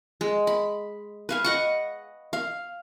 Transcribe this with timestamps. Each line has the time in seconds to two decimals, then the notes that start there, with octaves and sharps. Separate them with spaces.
0.21 G#3
0.47 B5
1.29 B4 F5 G#5
1.44 D#5 F#5 C#6
2.33 F5